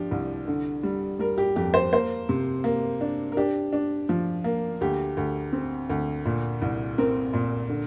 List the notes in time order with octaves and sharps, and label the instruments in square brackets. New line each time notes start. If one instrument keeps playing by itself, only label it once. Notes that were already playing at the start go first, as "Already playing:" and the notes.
Already playing: [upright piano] F3 D4 G4
C2
D3
G3
G3 A#4
G4
F2 G4
C5
A#3 C5
C3
A#3
D4
A#4
D4 G4
D4
F3
A#3
D2 G4
D2
C4
D2
A#2
C2
C4 A#4
A#2
D3